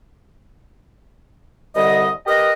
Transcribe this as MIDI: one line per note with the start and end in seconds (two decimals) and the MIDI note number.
1.76 2.10 36
1.76 2.10 50
1.76 2.10 55
1.76 2.10 75
2.27 2.51 67
2.27 2.51 70
2.27 2.51 71
2.27 2.51 75